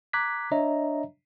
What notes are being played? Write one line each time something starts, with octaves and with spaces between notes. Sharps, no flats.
A#5 D6 F#6 G#6 B6
D4 C#5 D#5 E5 A#5